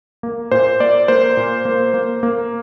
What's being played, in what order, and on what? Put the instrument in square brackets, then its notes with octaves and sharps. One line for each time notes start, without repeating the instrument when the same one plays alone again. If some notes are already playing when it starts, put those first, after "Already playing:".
[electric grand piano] A#3
A#2 C5
A#3 D5
A#3 C5
A#2
A#3
A#3
A#3